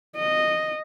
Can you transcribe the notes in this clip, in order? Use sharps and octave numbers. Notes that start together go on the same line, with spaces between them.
D#5